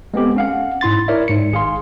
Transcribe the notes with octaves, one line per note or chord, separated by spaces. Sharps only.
G#3 B3 C4 G4 A4
C#4 F5 F#5
G#2 E4 C6 A6
E4 A#4 C#5 D5 E5
G#2 C#7
G#1 G#4 F5 C6